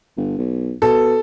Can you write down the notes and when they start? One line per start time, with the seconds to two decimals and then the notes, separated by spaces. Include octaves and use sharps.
0.17 G1
0.38 B1
0.82 B2 A4